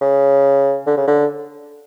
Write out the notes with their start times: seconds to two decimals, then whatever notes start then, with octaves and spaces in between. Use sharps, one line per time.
0.01 C#3
0.86 D3
0.97 C#3
1.07 D3